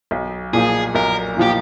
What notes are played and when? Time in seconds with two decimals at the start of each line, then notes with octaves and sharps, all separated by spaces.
0.11 B1
0.53 A#2 F3 G#4
0.95 B1 A#4
1.37 A#2 F3 G4